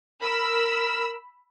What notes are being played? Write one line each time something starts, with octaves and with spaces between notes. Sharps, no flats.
A#4 B5 E6